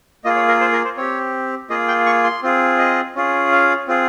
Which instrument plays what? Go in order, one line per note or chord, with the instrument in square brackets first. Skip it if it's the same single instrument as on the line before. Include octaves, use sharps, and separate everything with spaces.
[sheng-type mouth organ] A#3 F4 G#4 D#5
C#5
A#4
C5
A#4
C5
C4 G4 C#5
A#3 F4 G#4 D#5
G5
C#6
C6
C4 F4 G#4
D#5
C#4 F4 G#4
F5
C4 F4 G#4